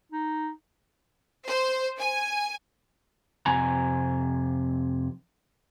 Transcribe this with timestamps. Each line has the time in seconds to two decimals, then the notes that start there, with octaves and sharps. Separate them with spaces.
0.12 D#4
1.47 C5
1.99 G#5
3.46 F2 C3 G#5 A#5